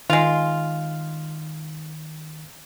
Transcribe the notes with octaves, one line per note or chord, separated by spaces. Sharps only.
D#3 G#3 F4